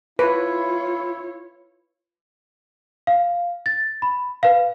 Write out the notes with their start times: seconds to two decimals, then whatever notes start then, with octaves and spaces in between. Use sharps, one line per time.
0.19 E4 F4 B4 C#5
3.07 F5
3.66 A6
4.02 B5
4.43 B4 F5